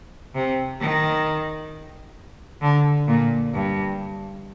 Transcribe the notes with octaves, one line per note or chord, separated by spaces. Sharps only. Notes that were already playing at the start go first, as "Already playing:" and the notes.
C3
D#3
D3
A#2
G2